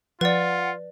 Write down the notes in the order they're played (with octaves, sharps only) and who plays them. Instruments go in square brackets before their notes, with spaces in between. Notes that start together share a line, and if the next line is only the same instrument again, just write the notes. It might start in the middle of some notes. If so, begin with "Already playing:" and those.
[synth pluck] F3 [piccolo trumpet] F4 [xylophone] B4 D5 [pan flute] F#5